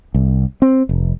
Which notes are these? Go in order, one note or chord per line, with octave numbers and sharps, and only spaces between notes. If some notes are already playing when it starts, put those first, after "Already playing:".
C2
C4
F1